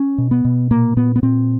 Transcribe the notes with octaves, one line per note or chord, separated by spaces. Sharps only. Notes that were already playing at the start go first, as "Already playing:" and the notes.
Already playing: C#4
B2
B3
B2
A#2 A#3
A#2 B3
B3
A#2 C4